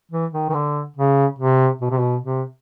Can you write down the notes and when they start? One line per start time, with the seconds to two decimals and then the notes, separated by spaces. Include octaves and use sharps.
0.11 E3
0.33 D#3
0.50 D#3
0.54 D3
0.96 C#3
1.39 C3
1.81 B2
1.91 C3
2.00 B2
2.23 C3